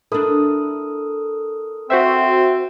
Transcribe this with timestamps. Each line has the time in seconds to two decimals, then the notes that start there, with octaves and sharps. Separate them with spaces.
0.12 D4 E4 A4 A#4 D#6
1.90 C4 F#4 C5 E5